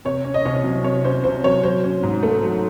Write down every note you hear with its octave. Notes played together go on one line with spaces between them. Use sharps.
C3 C#5
C#4
D#5
C2 C#5
F#3
C3 C#5
C#4 C5
C2 C5
F#3 C#5
F#3 C5
C#4
G#2
A3
F#3